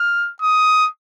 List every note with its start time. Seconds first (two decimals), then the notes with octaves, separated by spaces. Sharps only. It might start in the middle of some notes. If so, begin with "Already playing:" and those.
Already playing: F6
0.42 D#6